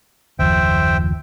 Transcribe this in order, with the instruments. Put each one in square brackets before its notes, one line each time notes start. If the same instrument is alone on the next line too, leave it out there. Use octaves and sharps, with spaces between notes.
[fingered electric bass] F#1 D#2 F3 [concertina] C5 E5 G5